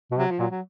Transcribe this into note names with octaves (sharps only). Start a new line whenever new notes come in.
B2
C3 F#3
F3
A#2 F#3
F#3